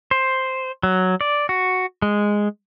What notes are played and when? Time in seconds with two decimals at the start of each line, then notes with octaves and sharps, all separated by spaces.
0.11 C5
0.83 F#3
1.21 D5
1.49 F#4
2.02 G#3